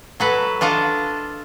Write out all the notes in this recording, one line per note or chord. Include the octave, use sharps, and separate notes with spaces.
F#3 A4 B4
D4 F4 A4 D#5